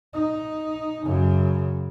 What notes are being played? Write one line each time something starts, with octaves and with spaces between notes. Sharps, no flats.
D#4
F#2 C#3